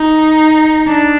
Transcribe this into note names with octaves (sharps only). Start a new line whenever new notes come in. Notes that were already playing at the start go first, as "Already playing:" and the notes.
Already playing: D#4
D4